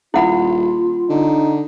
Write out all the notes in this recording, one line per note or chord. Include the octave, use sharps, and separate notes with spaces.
D#1 E4 F4 F#5 B5
D3 D#4